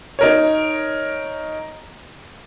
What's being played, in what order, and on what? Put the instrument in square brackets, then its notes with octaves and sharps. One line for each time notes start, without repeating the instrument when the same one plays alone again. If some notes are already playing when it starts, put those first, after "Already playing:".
[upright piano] D#4 A#4 C#5